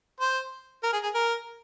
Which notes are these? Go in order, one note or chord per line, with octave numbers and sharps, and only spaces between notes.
C5
A#4
G#4
G#4
A#4